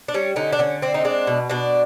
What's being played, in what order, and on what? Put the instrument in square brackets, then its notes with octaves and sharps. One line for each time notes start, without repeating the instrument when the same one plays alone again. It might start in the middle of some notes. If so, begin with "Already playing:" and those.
[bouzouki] D4
G3 C#4
D3 C#4 D#4
D4
D3 C#4
C4 D4
D#4
G#3 D4
B2
B2 D4